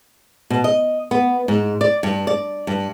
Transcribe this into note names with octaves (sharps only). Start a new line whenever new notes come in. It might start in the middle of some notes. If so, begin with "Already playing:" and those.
B2
D#5
B3
G#2
D5
G2
D5
G2